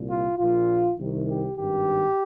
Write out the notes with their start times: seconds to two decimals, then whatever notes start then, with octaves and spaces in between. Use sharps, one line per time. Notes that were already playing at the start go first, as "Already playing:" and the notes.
Already playing: C2 A#2
0.08 F4
0.38 A#1 A#2 F4
0.98 C2 C3 D#3
1.27 G4
1.57 G#1 G2 D#3 G4